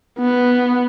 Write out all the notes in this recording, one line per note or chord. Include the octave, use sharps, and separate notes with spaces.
B3